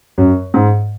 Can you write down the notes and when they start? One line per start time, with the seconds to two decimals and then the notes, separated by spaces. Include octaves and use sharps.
0.18 F#2
0.54 G#2